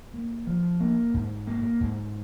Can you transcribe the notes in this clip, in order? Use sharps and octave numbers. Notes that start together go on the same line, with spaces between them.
A#3
F3
A#3
G#2
A#3
G#2